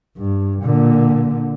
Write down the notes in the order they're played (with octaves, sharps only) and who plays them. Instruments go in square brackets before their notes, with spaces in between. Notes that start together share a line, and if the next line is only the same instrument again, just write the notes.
[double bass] G2
A#2 D3